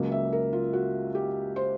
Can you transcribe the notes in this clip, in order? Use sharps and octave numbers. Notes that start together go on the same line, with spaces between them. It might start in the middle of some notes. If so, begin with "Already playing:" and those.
Already playing: C#2 C#3 F#3 A#3
E5
A#4
F4
F#4
G4
C5